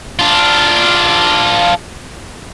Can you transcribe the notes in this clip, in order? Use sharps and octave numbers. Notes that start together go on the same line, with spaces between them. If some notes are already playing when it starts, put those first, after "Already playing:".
D4 F4